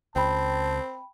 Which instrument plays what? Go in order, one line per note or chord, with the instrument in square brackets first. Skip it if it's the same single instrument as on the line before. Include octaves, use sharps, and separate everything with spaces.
[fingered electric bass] C#2 [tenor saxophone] C4 [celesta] G5 B5 [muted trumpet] A5